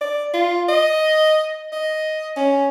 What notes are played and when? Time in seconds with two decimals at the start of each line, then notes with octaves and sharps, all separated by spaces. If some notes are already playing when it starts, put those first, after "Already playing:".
0.01 D5
0.33 F4
0.68 D#5
1.72 D#5
2.36 C#4